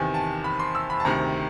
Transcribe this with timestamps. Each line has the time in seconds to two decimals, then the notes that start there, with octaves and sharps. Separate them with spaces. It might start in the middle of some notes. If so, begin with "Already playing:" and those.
Already playing: E2 C3 D#3 G#5
0.14 A5
0.44 B5
0.59 C6
0.75 E6
0.90 B5
1.00 A5
1.05 D2 C3 D#3 A#5